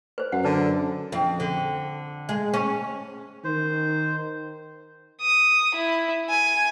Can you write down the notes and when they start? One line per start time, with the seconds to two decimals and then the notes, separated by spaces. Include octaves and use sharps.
0.18 B4 C5
0.32 F#2 F#5
0.44 D3 B4 A5
1.12 F2
1.40 D3
2.29 G#3
2.54 C#4
3.44 D#3 C5
5.21 D#6
5.75 E4
6.29 G#5